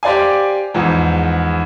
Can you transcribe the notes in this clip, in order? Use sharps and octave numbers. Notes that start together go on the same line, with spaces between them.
G4 C5 D5 F5 G#5
E2 G#2 F3